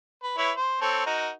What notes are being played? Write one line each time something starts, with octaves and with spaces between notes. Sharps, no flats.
B4
E4 B4 C#5
C5
C4 A4 C#5
D#4 F#4 A#4